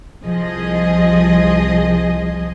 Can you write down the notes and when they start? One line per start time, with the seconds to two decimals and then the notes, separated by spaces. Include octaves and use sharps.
0.24 C2 F3 G#4 D#5